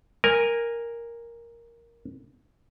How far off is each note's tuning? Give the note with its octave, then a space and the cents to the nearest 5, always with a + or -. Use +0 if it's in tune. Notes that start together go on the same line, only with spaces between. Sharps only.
A#4 +0 G#5 -15